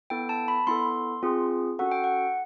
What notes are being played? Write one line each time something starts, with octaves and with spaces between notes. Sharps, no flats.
B3 E4 A4 G5
A5
B5
B3 E4 A4 C6
C4 F4 G#4
C#4 F#4 A4 F#5
G5
F#5